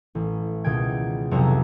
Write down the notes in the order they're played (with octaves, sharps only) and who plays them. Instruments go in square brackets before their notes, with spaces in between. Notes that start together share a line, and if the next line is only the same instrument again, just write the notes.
[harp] A1
C#2 B2 D#3 G5 G#6
B1 F2 C3 C#5 A#5 E7